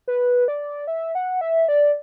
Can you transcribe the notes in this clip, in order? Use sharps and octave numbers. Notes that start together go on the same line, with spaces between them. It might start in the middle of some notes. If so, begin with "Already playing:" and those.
B4
D5
E5
F#5
E5
D5